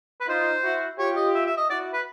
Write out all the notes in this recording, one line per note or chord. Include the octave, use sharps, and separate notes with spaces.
B4
D#4 F4 C5
E4 F#4
F4 G4 C#5
D#5
E5
E5
D#5
E4 F#4 D5
B4